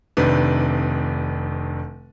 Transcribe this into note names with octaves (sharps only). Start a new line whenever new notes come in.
F1 C3 D#3 D4 B4